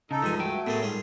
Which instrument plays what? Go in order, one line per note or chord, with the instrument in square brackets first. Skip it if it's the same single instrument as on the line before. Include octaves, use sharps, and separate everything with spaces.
[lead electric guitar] C#3 [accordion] D#4 A4
[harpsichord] C#2 G2 G#5 [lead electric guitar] E3 F3
[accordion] F#3 A3 [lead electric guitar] G5 A5
[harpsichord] A2 A#3 G#4 [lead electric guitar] B3 A4
[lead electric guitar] G#2 [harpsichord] G3 F4 G#4